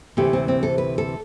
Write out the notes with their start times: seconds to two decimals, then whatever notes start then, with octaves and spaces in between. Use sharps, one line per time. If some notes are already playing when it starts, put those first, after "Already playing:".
0.17 D2 C3 E3 A3 G4
0.33 C4
0.48 C4
0.63 A4
0.78 B4
0.98 A4